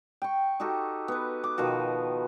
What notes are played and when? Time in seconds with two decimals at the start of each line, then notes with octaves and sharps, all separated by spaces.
0.22 G5 C#6
0.60 D#4 F#4 G4 A4
1.08 B3 B4
1.44 D6
1.58 B2 D#3 F3 F#4